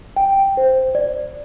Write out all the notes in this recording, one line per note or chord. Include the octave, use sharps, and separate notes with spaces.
G5
C5
D5